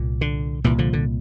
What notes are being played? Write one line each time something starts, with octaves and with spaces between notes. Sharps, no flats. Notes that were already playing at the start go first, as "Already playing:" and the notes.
Already playing: C2 A#2
D3
C2 A#2 E3
D3 F3
D3